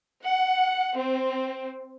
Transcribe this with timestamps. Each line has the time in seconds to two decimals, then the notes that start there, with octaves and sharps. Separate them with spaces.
0.23 F#5
0.97 C4